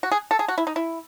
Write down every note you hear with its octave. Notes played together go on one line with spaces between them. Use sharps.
F#4
G#4
A4
G#4
F#4
E4
D#4
E4